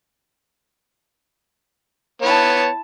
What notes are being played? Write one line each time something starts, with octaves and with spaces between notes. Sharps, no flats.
B3 E4 C#5 A5